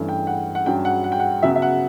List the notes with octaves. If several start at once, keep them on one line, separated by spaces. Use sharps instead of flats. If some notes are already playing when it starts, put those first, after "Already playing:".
Already playing: G2 E3 A3 C#4
G5
F#5
F#5
G2 F#3 C#4 G5
F#5
F#5
G5
F#5
C#3 F#3 B3 E5
E5
F#5